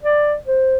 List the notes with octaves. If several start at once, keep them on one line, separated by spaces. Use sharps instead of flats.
D5
C5